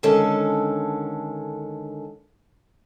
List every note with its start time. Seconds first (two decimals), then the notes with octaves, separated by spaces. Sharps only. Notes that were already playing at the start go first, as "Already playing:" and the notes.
0.03 D3 D#3 G#3 C#4 A4